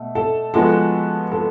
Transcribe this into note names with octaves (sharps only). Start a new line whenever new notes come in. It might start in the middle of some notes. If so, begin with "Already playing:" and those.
Already playing: B2 A3
A4
F3 G#3 B3 F#4 A4 B4
A4